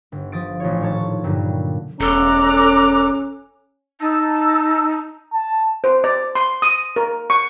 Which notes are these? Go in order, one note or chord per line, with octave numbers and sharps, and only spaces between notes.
G1
F3 D#6 A6 D7
A1 F4 C#5
D#1 A2 C#5 A5
G2 A#2 D3 F#3 G3
E1 C#4 A4 A#5 D6 F#6
D#4 A5 E6
A5
C5
D5
C6
D#6
A#4
C#6